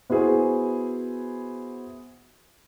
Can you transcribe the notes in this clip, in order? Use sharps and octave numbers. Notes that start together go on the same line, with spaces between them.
B3 E4 F#4 G#4 C5